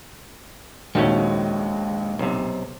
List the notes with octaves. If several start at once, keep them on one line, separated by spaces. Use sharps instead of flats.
A#1 D#2 D#3 G#3 A3 C#4 F#4
B1 C3